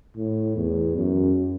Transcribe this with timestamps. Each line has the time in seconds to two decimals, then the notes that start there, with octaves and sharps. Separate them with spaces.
0.17 A2
0.56 E2
0.97 F#2